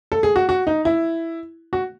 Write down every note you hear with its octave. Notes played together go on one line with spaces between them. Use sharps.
A4
G#4
F#4
F#4
D#4
E4
F#4